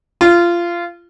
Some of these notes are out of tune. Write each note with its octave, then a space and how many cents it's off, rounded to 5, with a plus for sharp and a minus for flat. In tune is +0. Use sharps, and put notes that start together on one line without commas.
F4 -20